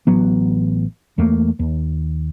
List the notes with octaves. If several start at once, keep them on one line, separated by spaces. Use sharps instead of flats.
A1 F#3 B3
E2 A3 A#3
D#2